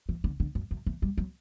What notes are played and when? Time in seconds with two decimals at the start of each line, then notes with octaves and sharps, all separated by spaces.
0.09 E3
0.24 D3
0.40 D3
0.55 F#2
0.71 F#2
0.86 E3
1.02 G3
1.18 F#3